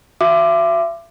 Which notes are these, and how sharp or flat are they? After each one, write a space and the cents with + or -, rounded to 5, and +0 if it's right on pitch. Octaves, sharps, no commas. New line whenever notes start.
F#4 +0 E5 +35 D6 +15